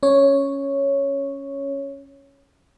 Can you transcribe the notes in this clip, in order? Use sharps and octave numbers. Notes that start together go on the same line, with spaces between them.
C#4 C#5